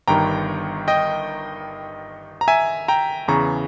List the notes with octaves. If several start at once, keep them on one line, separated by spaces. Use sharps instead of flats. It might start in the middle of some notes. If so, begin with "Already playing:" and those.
G1 G2 D#3 G5 A#5
D#5 G5
A#5
E5 G#5
G5 A#5
E2 C#3 E3 A#5 C#6